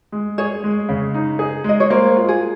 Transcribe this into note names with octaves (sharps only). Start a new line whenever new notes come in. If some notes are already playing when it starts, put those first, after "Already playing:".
G#3
G#4 C#5
G#3
C#3
D#4
G#4
G#3 D#5
C#5
A#3 C5
F4
G#4